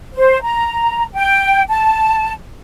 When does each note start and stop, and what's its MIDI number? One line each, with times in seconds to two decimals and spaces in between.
0.13 0.41 72
0.42 1.04 82
1.14 1.62 79
1.68 2.32 81